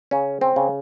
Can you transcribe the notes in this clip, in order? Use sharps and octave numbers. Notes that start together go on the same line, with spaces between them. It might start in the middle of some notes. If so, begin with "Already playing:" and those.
C#3 C#4
C4
C#3